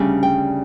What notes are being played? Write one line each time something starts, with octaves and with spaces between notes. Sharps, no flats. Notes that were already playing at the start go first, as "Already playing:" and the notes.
Already playing: D2 C#3 G3 D4
G5